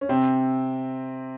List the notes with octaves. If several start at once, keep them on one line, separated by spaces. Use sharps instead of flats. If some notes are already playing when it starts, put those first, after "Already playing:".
C#4
C3 C4